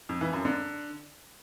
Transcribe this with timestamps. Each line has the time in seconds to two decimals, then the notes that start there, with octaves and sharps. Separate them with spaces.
0.09 F2
0.21 E3
0.33 F#2
0.45 D3